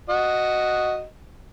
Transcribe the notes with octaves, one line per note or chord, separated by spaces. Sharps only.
F#4 D#5